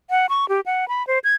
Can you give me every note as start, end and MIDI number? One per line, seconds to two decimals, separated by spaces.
0.10 0.26 78
0.29 0.48 85
0.49 0.61 67
0.66 0.88 78
0.88 1.06 83
1.07 1.19 72
1.24 1.35 92